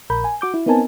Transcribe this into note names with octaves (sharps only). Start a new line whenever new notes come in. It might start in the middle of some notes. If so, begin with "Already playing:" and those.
A#1 A#4 B5 G6
G#5
F#4 D6 G6
E4
B3 C4 D#4 A#4 G#5 A5